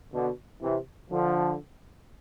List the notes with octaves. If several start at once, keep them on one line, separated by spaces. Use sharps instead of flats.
B2 D3
C3 E3
D3 F3